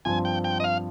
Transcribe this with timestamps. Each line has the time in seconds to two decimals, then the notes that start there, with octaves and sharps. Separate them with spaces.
0.05 G2 F3 C4 G#5
0.25 G5
0.44 G5
0.60 D#5
0.64 F5